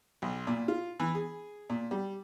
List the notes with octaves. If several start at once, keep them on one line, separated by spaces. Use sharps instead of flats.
B1
A#2
F4
E3
G#4
A#2
G3